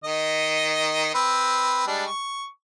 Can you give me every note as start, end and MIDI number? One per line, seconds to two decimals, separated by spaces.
0.04 1.14 51
0.04 1.14 75
1.14 1.83 60
1.14 1.83 71
1.87 2.06 55
1.87 2.06 56
1.87 2.06 62
2.07 2.45 85